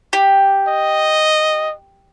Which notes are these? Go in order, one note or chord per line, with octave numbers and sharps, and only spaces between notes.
G4
D#5